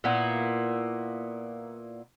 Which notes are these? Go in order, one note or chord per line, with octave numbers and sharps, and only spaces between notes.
A#2 A#3 B3 E4